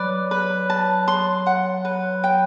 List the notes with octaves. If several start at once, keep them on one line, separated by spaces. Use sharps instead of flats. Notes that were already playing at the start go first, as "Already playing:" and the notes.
Already playing: F#3 B4 D5
B4
A5
C6
F#5
B4
G5